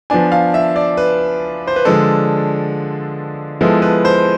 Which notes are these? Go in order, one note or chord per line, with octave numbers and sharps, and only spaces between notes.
F3 B3 D4 G#5
F5
E5
D5
B4
C5
B4
D3 F3 G#3 D4 A4
F3 G#3 B3 E4 A4
B4
C5